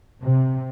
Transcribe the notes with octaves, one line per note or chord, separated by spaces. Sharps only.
C3